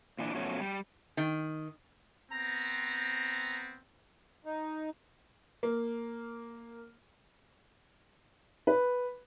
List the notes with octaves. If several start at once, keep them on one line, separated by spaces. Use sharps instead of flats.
A#2 E3 D4
B2 F3 F#3 A3 C#4
G3
D#3
B3 C4 A#5
D#4
A#3
B4